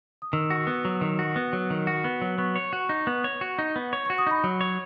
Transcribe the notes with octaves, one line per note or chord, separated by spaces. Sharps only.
D#6
D#3 E6
F#4
B3
F#3
D#3
F#4
B3
F#3
D#3
F#4
B3
F#3
B3 C#6
C#5
C#6
F#4
D#4 C#6
B3
C#5
F#4
D#4
B3
C#5
C#6
F#4
D#6
D#4 B5
F#3 B5
C#5